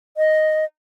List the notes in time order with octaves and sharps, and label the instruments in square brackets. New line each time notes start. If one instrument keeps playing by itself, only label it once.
[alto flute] D#5